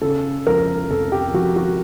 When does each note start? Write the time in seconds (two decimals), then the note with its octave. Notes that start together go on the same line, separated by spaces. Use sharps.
0.01 C#3 A4
0.46 F2 A#4
0.90 F1 A4
1.12 G4
1.34 F2 F#4
1.56 F#4